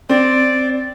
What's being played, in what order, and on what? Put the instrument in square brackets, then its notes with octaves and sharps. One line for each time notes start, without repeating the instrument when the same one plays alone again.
[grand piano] C4 [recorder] D5